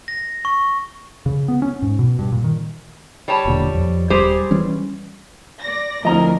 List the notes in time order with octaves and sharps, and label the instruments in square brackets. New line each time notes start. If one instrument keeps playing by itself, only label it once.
[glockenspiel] A#6
C#6
[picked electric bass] C#3
B3
C#4
G#2
B2
G2
A#2
D#3
[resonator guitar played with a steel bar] G3 C#5 A5
[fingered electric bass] E1 A#2 D3
F2
[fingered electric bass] D#1 A#1 G3 [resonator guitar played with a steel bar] G4 G#4 C5
[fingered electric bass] E3 G3 C#4
[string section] D5 A#6
[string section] D2 A#4 [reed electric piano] F3 C4 E4 [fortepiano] D#5 A#5